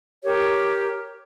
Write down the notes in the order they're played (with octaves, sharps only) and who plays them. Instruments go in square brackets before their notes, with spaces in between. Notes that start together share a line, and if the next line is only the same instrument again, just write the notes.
[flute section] G4 A#4 C#5